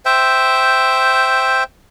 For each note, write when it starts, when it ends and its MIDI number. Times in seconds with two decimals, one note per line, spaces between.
0.05 1.64 72
0.05 1.64 76
0.05 1.64 79